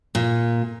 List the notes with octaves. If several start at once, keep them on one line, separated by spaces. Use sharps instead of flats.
A#2